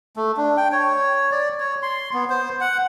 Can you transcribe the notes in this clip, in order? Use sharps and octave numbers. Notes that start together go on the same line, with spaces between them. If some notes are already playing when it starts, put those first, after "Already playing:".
A3
D4
G5
C#5
D5
C#5
C6
B3
C5
F#5